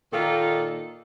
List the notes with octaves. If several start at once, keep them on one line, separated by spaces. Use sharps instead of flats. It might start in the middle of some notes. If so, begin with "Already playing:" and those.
A#2 D#3 D#4 F4 A4